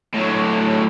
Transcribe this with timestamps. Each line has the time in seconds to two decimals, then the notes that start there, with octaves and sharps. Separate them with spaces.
0.14 A2 F#3